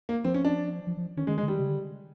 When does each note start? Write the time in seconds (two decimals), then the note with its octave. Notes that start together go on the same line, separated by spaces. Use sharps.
0.09 A#3
0.24 F3 C4
0.34 C#4
0.45 D4
0.87 F3
0.97 F3
1.17 D#3 C#4
1.27 D#3 G#3
1.38 G#3
1.43 D3
1.48 D#3 G3
1.59 C#3
1.69 D3